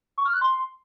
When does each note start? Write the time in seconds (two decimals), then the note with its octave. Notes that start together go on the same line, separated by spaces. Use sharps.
0.18 C#6
0.25 F6
0.33 F#6
0.41 C6